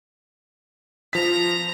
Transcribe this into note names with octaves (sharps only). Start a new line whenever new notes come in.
F3 A#5 B6